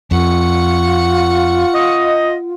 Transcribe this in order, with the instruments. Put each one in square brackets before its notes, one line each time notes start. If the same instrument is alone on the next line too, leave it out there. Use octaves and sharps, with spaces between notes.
[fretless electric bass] F2 [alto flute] F4 [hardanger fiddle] F#5 C#6
[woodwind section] D#5